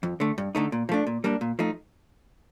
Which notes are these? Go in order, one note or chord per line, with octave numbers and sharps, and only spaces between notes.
F2
D3 A3
G2
D3 A3 D#4
A#2
F3 A3 D4
A#2
G3 A#3 D4
A#2
F3 A3 D#4